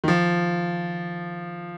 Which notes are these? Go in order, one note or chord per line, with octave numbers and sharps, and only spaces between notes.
D#3
F3